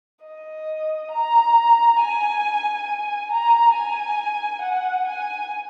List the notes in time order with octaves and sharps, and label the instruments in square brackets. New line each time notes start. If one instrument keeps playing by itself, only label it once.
[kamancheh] D#5
A#5
G#5
G#5
A#5
G#5
F#5
G#5